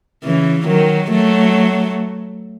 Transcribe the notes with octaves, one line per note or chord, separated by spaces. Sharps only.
C#3 E3
D#3 F#3
F#3 A3